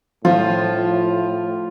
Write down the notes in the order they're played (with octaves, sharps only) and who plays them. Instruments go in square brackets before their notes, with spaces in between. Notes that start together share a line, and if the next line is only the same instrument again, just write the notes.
[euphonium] A2 [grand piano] F3 [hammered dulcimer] F4